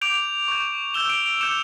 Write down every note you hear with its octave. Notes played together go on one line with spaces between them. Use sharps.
D6 G6 D7 F7
C#6 G6
C#6 E6 G6 E7 G7
D7 F7
D7 F7
D6 G6 C#7 E7